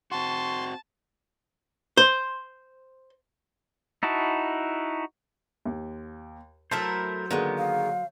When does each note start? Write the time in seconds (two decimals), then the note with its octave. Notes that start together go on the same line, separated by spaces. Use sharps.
0.12 C4 F#4 A5 C6 C#6
1.97 C5
4.03 D#4 E4 F#4 A5
5.66 D#2
6.71 F#3 A3 E4 A4 A#4 C5 A5
7.31 D3 D#3 G#3 A#3 B3
7.58 F5